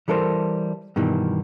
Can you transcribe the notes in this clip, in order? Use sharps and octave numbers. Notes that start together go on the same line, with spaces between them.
E3 G3 A4 A#4 C5
G2 B2 D#3 E3